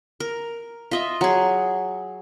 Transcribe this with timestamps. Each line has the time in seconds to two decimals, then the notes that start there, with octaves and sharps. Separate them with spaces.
0.20 A#4
0.91 F4 D#5 E5
1.21 F#3 G#4